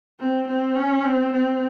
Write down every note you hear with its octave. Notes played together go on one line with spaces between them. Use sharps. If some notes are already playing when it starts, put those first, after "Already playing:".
C4
C4
C#4
C4
C4